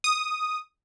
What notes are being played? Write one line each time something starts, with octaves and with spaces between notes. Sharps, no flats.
D#6